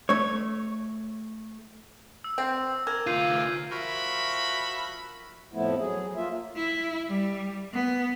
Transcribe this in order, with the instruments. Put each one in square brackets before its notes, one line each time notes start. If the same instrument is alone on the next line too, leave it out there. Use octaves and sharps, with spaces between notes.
[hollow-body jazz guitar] A3 C#5
[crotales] E6
[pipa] C4
[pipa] A#4 [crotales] D6 F6 G#6
[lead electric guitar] D2 F4 [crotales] G6 C7 D#7
[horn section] F3 F#4 A#4 E5 B5
[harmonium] F2 A2 F3 A3 B3 E4
F#3 G#4
A#3 F4 E5
[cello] E4
G3
B3